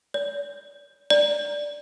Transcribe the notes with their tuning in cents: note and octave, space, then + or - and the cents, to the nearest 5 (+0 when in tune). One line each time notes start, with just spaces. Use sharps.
D5 -40
D5 -5